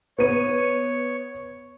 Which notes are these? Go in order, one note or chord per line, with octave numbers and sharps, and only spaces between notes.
B3 C#5 D#7